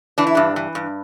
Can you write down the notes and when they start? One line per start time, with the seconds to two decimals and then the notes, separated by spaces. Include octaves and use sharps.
0.18 E3 D4
0.27 E4
0.35 G2 D4
0.56 E3
0.75 G2